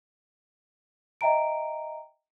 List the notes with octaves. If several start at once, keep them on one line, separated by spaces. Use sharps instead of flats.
D#5 E5 G5 A#5 D7